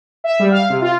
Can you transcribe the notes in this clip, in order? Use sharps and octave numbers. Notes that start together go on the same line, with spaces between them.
E5
G3
F5
C3
F4